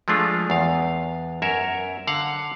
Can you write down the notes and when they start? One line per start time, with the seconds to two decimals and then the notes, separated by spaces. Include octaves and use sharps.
0.08 F3 G#3 A3 D4 F4
0.50 E2 F5
1.42 F#2 A#4 C#5 E5
2.07 D3 F5 F#5